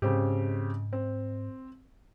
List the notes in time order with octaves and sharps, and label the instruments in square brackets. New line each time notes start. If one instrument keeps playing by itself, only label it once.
[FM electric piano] G#2 [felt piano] C#3 C4 G4
[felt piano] C4